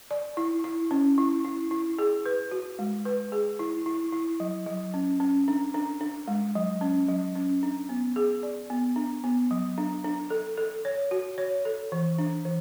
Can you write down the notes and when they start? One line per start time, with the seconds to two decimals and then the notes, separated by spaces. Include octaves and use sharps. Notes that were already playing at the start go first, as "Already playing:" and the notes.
0.11 D5
0.37 E4
0.64 E4
0.91 C#4
1.18 E4
1.45 E4
1.71 E4
1.99 G#4
2.26 B4
2.51 F#4
2.79 G#3
3.05 B4
3.32 G#4
3.59 E4
3.86 E4
4.12 E4
4.40 F#3
4.66 F#3
4.94 C#4
5.20 C#4
5.48 D4
5.74 D4
6.01 D4
6.28 G#3
6.55 F#3
6.81 C#4
7.09 F#3
7.36 C#4
7.63 D4
7.89 B3
8.16 G#4
8.43 D5
8.70 B3
8.96 D4
9.24 B3
9.51 F#3
9.78 D4
10.04 D4
10.30 A4
10.58 A4
10.85 C#5
11.11 F#4
11.38 C#5
11.65 A4
11.92 E3
12.18 D4
12.45 E3